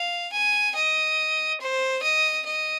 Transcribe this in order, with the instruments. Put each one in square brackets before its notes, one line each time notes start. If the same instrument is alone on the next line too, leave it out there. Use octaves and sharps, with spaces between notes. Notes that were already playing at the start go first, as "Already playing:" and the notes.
Already playing: [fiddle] F5
G#5
D#5
C5
D#5
D#5